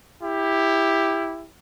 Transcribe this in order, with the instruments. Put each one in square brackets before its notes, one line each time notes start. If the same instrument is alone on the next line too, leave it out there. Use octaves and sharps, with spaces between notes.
[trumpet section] E4 G4